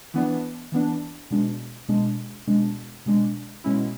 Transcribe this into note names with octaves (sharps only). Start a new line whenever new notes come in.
E3 B3 D4
E3 B3 D4
B2 G#3 D4
B2 G#3 D4
B2 G#3 D4
B2 G#3 D4
B2 G#3 C#4 E4